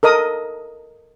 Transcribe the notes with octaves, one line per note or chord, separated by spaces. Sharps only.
A4 A#4 D#5 D#6